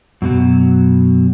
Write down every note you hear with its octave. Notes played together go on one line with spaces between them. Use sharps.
F#2 B2 F#3